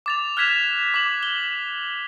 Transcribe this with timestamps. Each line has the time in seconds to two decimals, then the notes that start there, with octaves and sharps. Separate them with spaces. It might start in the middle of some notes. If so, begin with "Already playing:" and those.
0.06 D6 A6 F7
0.37 F6 F#6 G#6 B6 E7 F7
0.94 D6 F#7
1.23 G7